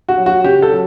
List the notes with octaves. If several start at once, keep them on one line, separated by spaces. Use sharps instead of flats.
F#4
F#3
F#4
C#3 G4
A4
F#3